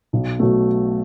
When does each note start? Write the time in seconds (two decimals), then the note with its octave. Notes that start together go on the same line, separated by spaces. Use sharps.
0.13 B1
0.39 B2 F#3 A3